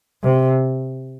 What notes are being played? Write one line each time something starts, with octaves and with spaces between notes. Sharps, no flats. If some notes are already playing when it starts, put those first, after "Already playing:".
C3